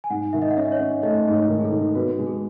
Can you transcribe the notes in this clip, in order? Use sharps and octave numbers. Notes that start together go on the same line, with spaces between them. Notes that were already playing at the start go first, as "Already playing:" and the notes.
G#5
G#2 F#5
D#3 E5
D#5
F#5
C#4 E5
D#5
C#5
C#4
A3 D#5
G#2 D#5
C#5
D#3
G#4
A4
D#3
B3 F#4
G#3
G#4